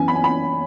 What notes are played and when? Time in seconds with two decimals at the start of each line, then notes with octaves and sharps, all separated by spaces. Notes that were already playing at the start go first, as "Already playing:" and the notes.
Already playing: F#2 E3 B3 G#5
0.08 B5
0.15 G#5
0.24 B5